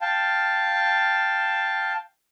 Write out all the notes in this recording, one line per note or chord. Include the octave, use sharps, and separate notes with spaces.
F5 G5 A5